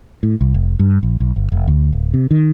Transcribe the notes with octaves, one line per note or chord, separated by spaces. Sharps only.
A2
C2
F1
G2
A#1
B1
G1
F1
D2
D1
C3
D#3